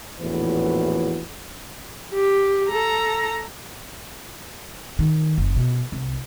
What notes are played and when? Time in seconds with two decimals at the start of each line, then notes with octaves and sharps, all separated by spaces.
0.20 A#1 E2 A2 E3 F#4 B4
2.13 G4
2.70 A4 A#5
4.99 D#3
5.37 F#1
5.56 B2
5.92 C2